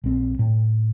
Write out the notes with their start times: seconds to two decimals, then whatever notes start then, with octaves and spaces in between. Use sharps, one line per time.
0.04 A#1 C4
0.39 A2